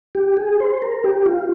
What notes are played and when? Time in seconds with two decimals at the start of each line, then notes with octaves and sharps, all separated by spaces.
0.15 G4
0.37 G#4
0.60 C5
0.82 A#4
1.04 G4
1.26 F4